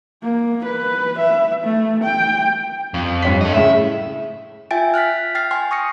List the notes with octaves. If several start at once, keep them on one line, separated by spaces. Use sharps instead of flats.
A#3
B4
E5
A3
G5
F2
G2 C#5 B6
A4 D#5
A2 C#3 E5
F4 E5 G5 G#5 A6 D7
F6 F#6 A6 B6
G5 F6 A6 C7
G5 G#5 C6 F6 C7
C#6 D#6 A#6 C#7